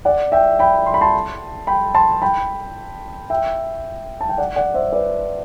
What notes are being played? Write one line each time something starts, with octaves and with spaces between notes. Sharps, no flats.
D5 F#5
E5 G5
G5 B5
C6
B5
A5 C6
G5 B5
A5 C6
G5 B5
E5 G5
A5
G5
D5 F#5
D5 F#5
C5 E5
B4 D5